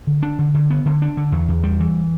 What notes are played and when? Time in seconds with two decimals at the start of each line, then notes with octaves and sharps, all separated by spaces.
0.07 D3
0.23 D4
0.39 D3
0.54 D3
0.70 B3
0.86 D3
1.02 D4
1.17 D3
1.32 E2
1.48 E2
1.64 G3
1.80 E3